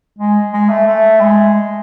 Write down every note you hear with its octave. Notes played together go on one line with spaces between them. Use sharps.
G#3
G#3
A3
A3
G#3